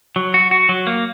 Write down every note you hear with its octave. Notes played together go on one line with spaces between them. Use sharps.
F#3
F#4
F#4
F#3
A#3